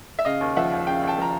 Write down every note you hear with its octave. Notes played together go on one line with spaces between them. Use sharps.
E5
C#3 D#5 F5
D#2
F3 E5 F#5
D#2
C#3 F5 G5
D#2
G5 A5
F3 A#5